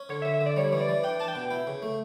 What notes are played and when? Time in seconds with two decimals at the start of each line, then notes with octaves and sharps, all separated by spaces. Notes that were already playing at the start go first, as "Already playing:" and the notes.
Already playing: C#4
0.09 D3 C#5
0.22 E5
0.25 D3
0.34 E5
0.41 D3
0.46 D5
0.57 G3 C#5
0.73 E3
0.80 D5
0.89 E3
1.03 D4 G5
1.20 D4 A5
1.28 G5
1.35 B2
1.51 E4
1.67 C#3
1.82 A3